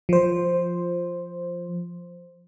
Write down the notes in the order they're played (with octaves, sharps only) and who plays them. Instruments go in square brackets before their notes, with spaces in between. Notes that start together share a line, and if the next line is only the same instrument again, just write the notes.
[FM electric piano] F3 C5